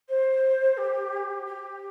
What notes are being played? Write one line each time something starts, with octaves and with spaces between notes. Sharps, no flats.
C5
G4
G4